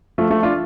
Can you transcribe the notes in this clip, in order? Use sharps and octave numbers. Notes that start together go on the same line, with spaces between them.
F3 A3
F3 A3
D4 F4